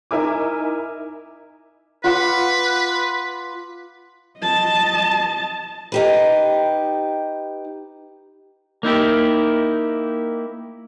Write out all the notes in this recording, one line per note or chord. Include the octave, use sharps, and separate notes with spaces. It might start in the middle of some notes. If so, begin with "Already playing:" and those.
D#4 E4 A#4 E5 G#5 D6
F4 B4 F#5 D6
D#5 A5
D#4 G4 B4
A#3 D#4 E4 G4